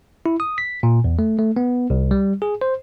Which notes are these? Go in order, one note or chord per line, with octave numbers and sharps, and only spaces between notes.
E4
D#6
B6
A#2
E2
A3
A3
B3
C2
G3
G#4
C5